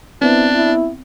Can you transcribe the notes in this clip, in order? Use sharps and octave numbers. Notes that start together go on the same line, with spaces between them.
B3 C4 D4 E4
E4